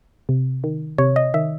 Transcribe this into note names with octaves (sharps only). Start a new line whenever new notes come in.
C3
D#3
C3 C#5
D#5
D#3 E5